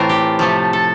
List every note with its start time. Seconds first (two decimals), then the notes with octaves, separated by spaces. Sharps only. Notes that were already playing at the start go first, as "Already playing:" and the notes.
Already playing: A2 E3 A3 C4 F4 A#4 C5
0.09 G4
0.39 C3 F3 A3 A4
0.73 A4